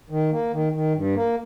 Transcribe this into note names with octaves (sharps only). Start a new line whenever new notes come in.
D#3
A#3
D#3
D#3
G2
A#3